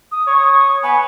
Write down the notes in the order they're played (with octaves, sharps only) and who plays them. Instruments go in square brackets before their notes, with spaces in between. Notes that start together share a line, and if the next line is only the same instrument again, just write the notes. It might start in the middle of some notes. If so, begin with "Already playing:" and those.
[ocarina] D#6
[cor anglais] C#5
[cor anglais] B3 [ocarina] G#5